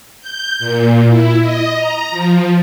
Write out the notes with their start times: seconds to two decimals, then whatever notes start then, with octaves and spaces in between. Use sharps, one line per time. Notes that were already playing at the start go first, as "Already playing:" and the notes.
0.21 G6
0.59 A#2
1.07 E4
1.41 D#5
1.76 A#5
2.11 F3